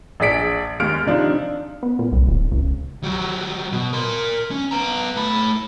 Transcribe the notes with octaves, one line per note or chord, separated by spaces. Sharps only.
A#1 G#4 D5 B6 D7
D#2 G#3 F6 D7
C3 F3 D4 D#4
B3
A#2
C2
D1
C#2
F#3 G3
B2
A#4 C6
C#4
B3 A#5
A3 B5